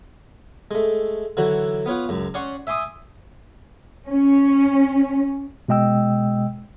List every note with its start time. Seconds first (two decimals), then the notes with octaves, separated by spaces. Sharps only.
0.71 G#3 A3
1.37 D3 E3 F#3 F#4
1.86 B3 F4 C#5 F#5
2.09 C#2 F#2
2.34 C#4 C#5 D5 F#5 C6 C#6
2.67 E5 G#5 C6 D6 D#6
4.07 C#4
5.68 B2 G#3 D#5 G5 E6